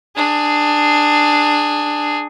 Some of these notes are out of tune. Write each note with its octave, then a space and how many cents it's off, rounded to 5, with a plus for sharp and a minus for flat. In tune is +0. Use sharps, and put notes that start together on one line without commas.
D4 +15 G#4 +0